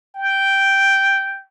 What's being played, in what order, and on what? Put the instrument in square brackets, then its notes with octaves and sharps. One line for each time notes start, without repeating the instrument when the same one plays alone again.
[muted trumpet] G5